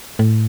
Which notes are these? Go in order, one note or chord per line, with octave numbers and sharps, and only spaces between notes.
A2